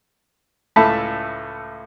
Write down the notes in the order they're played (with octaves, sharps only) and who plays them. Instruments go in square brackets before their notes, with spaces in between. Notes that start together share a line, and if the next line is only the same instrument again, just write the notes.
[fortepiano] C#2 A2 E5 A5 B5